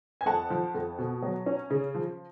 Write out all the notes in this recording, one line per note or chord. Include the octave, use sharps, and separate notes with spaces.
G#5
F2 F#5 A5
F3
F2
B2
F#3
C#4
C#3
F3